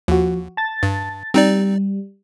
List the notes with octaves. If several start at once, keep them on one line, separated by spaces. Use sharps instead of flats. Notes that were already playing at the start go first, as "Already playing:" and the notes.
D#2 F3 F#4
A5 A6
G2
G3 C4 D#4 D5